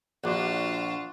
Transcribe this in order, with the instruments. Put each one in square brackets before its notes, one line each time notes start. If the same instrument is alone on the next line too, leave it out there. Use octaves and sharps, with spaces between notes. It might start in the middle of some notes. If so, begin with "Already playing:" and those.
[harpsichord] A#1 [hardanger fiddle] F4 A5 [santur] F#4 D5 F#5